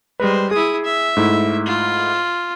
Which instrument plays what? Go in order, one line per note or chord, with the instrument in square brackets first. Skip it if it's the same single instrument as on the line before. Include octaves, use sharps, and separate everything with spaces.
[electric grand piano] G3 B4 [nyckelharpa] G#3 C5
[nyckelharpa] E4 D#6 [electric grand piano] G#4
[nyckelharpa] E5
[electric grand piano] G#2 A3 E4
[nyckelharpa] F4